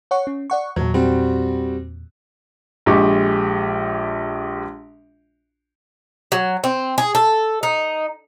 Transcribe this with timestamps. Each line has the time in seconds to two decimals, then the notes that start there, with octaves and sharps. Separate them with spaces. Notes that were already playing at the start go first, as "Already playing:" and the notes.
0.11 C#5 F#5 C#6
0.27 C#4
0.50 D5 F#5 C#6
0.76 E2 A#2 F#3
0.94 G3 C4 F#4
2.86 A#1 G#3 G4 C#6 D6
6.32 F#3
6.64 C4
6.98 G#4
7.15 A4
7.63 D#4